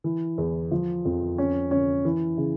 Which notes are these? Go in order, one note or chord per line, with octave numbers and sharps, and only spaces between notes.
E3
E2
F3
F2
C#4
C#4
E3
C#3